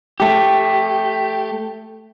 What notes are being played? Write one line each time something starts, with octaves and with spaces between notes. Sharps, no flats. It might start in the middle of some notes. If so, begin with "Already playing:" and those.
A3 G4